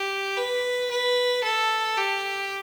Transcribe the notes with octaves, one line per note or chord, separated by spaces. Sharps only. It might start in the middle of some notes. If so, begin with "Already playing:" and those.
Already playing: G4
B4
B4
A4
G4